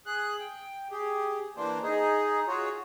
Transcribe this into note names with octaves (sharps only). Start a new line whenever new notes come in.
G#4 F#6
G5
G4 G#4
E3 A#3 D4 C5
D#4 G#4
F4 F#4 G#4 C#5